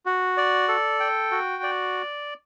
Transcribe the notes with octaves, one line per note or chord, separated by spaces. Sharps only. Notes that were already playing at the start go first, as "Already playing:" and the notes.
F#4
D5
A4
G5
F#4
D5